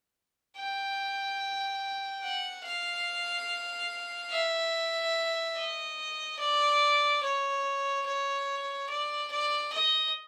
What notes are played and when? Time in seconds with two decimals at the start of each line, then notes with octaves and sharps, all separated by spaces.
0.58 G5
2.23 F#5
2.65 F5
4.31 E5
5.56 D#5
6.39 D5
7.23 C#5
8.06 C#5
8.89 D5
9.31 D5
9.73 D#5